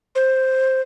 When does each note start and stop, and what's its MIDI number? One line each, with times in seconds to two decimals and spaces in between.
0.15 0.81 72